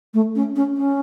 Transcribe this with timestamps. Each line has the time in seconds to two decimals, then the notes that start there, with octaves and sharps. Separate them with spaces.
0.14 A3
0.35 C#4
0.56 C#4
0.77 C#4